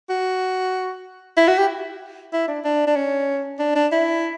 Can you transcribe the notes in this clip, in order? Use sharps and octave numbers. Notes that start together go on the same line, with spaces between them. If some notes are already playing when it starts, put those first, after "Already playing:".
F#4
E4
F#4
G4
E4
D4
D4
D4
C#4
D4
D4
E4